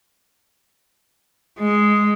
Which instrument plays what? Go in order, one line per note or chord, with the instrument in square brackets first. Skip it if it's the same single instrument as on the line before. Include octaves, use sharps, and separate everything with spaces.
[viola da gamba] G#3